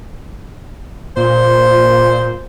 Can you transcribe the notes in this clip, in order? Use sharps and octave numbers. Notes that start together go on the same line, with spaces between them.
A#2 C5